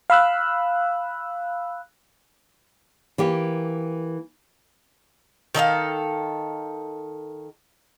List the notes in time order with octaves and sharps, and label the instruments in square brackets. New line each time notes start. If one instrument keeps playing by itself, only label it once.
[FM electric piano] F5 B5 E6 F#6
[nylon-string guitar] E3 A#3 G4
[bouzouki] D#3 A4 D#5 F5